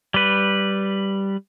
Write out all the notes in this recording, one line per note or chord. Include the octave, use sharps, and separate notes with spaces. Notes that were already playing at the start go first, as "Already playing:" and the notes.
G3 B4